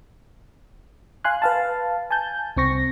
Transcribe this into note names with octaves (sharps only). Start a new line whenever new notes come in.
F5 G#5 C6 F#6
B4 F5 A5
G#5 A5 G6
C2 C4 C#6 A#6